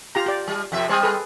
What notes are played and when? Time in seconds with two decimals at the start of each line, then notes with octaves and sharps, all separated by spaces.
0.15 F4 G4 A#5
0.26 G4 D5
0.48 G3
0.72 F2 C3 E5
0.89 G3 C4 C5 G#5 D#6
1.03 G#4 A4 B4